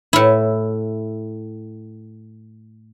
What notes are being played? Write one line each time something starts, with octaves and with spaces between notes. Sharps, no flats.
A2 E4